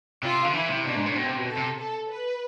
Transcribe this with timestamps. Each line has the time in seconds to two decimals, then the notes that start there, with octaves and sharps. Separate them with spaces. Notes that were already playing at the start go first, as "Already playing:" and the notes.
0.23 C3 F4
0.44 D3
0.53 E3 E4
0.70 C3
0.85 B2 D4
0.96 G#2
1.06 A2
1.16 B2 C4
1.26 C3
1.37 B2
1.47 A4
1.57 C3
1.78 A4
2.10 B4